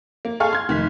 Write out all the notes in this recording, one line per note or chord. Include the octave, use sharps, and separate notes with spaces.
A#3
G#4 A4 F5 G#5 C#6 F6
C6 G#6
F1 D#3 B6